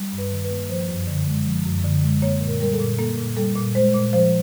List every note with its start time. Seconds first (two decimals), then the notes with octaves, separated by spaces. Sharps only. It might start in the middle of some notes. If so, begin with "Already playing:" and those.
Already playing: G3
0.12 G2
0.18 B4
0.31 D#3
0.44 B4
0.51 A#3
0.69 F3 C5
0.88 F#2
1.07 D3
1.27 G#3
1.46 F3
1.66 F#2
1.84 D3
2.04 G#3
2.22 A#3 C#5
2.41 A#2
2.47 A#4
2.60 G3 A#4
2.73 A4
2.80 A#2
2.99 A#3 A4
3.18 A#2
3.37 G3 A4
3.56 A#2
3.75 G#3 C5
3.94 A#2
4.13 F3 C5